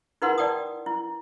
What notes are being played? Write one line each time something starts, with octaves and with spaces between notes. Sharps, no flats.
D#4 E4 A#4 B4 F#5 C6
D5 G5 A5 D#6
E4